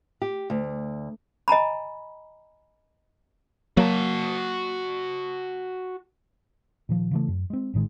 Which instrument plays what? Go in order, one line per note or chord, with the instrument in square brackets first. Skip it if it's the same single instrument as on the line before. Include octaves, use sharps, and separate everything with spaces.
[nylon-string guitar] G4
D2
[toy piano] D#5 G#5 A#5 B5
[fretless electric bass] F#3 A#3 [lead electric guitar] F#4 A5
[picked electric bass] A#2 D#3 F3
C#3 E3 A3
F#2
G#3 C4
A1 A2 D#3 G#3